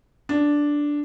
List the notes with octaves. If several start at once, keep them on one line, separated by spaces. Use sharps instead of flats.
D4